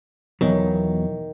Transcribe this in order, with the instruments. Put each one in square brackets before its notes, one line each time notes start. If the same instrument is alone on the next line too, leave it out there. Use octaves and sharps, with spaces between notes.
[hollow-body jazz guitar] E2 B2 F#3 [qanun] D#3